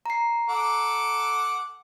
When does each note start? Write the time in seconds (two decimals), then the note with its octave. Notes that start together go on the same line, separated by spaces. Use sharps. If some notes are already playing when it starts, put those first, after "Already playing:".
0.06 A#5 C7
0.49 A4 F#5 D6